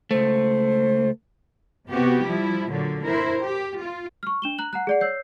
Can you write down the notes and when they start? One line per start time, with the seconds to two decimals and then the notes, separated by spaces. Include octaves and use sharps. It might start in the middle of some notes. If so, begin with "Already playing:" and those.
0.11 C#2 A3 C5
1.89 C3 B3 F#4 G4
2.22 F3 G3 E4
2.69 A#2 D3 F#3
3.04 E4 A#4 C5
3.43 G4
3.79 F4
4.23 C#6 F6
4.42 D4 E7 G7
4.58 A#5 F#6 F#7
4.73 F#5 A#5 F#6
4.87 G#4 D5 F#5
5.01 C#5 E6 G6 C7